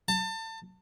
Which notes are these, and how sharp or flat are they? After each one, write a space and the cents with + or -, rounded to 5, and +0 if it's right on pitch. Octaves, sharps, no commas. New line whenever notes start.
A5 +30